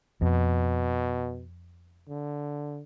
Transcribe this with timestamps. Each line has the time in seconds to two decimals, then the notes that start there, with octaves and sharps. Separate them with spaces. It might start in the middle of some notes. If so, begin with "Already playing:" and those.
0.22 F2 B2
2.08 D3